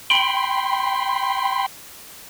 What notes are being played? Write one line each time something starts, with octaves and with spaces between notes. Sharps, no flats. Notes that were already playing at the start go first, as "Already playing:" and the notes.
G5 B5 C6